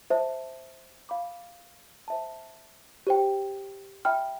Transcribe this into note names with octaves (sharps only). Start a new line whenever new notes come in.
C5 E5 A5
F5 B5 D6
C5 E5 A5
G4 C5 G5
E5 G5 B5 F6